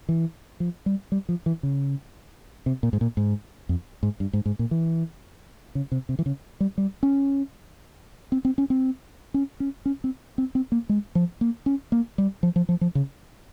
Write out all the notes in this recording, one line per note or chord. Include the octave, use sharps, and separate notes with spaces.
E3
F3
G3
G3
F3
E3
C#3
C3
A#2
G#2
A#2
G#2
F2
G#2
G2
G#2
G#2
A#2
E3
C#3
C3
C3
E3
C#3
G3
G3
C#4
C4
C4
C#4
C4
C#4
C#4
C#4
C4
C4
C4
A#3
G#3
F3
A#3
C#4
A#3
G3
F3
F3
F3
F3
C#3